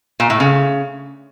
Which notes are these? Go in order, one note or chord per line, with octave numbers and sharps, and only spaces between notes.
A#2
A2
C#3